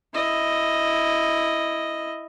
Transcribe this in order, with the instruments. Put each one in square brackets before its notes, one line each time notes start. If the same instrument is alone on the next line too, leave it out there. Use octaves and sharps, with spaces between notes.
[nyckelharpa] E4 D#5